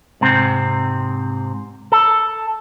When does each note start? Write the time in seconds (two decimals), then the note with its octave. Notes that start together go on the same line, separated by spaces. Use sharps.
0.21 G#2 C3 C4
1.92 A4